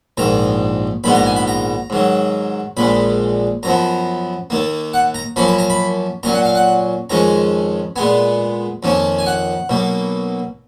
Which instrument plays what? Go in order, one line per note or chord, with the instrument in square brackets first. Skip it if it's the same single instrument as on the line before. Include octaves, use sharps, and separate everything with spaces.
[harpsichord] A#1 G#2 D#3 A#5
A#1 G#2 D#3 G#3 B3 B5
A#5
G#5
B5
A#5
G#2 D#3 F#3
A#1 A#2 G#3 B5
F#2 F3 B3 A#5
D#2 D#3 A#3
F#5
A#5
F#2 F3 A#3 C#4 B5
B5
A#5
B5
A#2 F#3 C#4 A#5
F#5
F5
F#5
F2 D#3 G#3 C#4 A#5
A#2 G#3 B3 G#5
F2 D#3 A#3 C#4
G#5
F#5
B1 B2 A#3